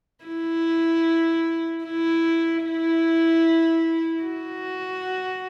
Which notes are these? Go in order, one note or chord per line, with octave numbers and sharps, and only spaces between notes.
E4
E4
E4
F#4